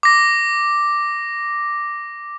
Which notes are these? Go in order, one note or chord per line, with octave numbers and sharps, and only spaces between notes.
D6 A#6